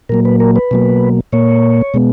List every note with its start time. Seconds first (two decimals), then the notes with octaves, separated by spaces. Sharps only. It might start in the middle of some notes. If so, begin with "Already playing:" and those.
0.09 A#2 F#3 A#3 A#4
0.25 B4
0.40 A#4
0.56 B4
0.71 B2 F#3 A#3
1.32 A#2 A#3 C#5
1.94 B2 G#3 B3